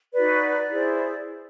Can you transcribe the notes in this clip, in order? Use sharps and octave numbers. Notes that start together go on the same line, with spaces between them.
D#4 F#4 B4 D5
E4 G#4 C5